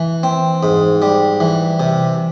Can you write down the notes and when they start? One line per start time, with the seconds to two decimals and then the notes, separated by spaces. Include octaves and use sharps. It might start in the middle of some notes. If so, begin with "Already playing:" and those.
Already playing: E3
0.23 C4
0.63 G#2
1.02 G3
1.40 E3
1.80 C3